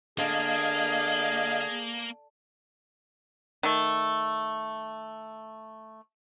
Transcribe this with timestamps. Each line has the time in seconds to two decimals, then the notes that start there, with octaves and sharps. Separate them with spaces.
0.18 D3 A#3 G#4 D#5 F5
3.63 D#3 A3